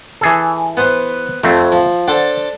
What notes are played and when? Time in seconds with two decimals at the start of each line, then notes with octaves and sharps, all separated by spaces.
0.21 E3 G#4 A4
0.77 B3 B4 C5
1.44 F2 A3 C4
1.72 F3
2.08 D4 A4 C5 F#5